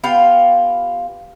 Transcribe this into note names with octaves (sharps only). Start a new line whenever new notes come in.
B3 F4 G4 F5